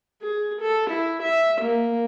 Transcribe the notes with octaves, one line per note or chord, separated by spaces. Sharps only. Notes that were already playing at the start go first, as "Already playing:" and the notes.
G#4
A4
E4
E5
A#3